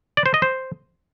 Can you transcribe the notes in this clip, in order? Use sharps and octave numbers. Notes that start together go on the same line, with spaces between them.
D5
C5
D#5
C5